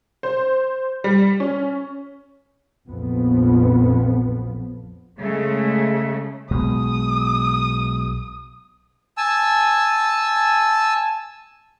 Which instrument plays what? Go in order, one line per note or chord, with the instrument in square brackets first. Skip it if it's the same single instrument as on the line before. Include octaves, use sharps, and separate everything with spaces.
[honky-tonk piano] C5
G3
C#4
[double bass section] A#1 F2 F3 B3
[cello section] C#3 G#3 A3
[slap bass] B1 B2 G#3 [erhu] D#6
[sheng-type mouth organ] G#5 A5 E6